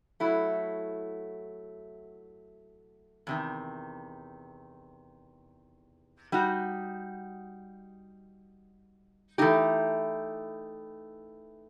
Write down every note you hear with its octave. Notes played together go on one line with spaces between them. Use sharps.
F#3 A3 E4
E2 C3 D#3
G3 D#4 F#4
E3 A3 D#4 G4